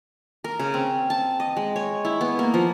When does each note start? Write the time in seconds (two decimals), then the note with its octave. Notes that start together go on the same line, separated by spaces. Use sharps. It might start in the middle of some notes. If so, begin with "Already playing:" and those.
0.44 A#4
0.59 C#3
0.74 C4
1.10 A5
1.40 D#5
1.57 G#3
1.76 C#5
2.05 E4
2.21 B3
2.39 A#3
2.54 F3